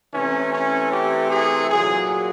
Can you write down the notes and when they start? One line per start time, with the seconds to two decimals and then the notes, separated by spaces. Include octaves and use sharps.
0.14 C3 E3 A3 C#4
0.53 C#4
0.92 G4
1.30 G#4
1.70 A#2 F#3 A#3 G#4